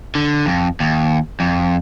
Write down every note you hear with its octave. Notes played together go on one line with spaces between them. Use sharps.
D3
F2
D#2
F2